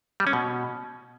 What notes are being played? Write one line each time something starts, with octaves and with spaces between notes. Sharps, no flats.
G3
C#4
B2